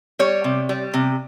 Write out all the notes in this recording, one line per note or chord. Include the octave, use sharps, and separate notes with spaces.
G3 C#5
C3
G3
C3